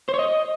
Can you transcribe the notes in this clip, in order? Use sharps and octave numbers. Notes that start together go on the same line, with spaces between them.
C5
C#5
D#5